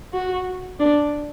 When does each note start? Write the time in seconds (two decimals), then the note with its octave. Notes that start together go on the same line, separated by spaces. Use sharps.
0.13 F#4
0.80 D4